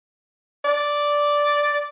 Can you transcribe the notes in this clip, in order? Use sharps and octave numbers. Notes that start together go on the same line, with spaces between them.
D5